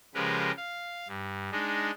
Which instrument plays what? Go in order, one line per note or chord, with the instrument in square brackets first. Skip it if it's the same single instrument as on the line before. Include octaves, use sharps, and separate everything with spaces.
[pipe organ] C#3 F3 G#3 G4 A#4 B4
F5
G2
G#3 D4 D#4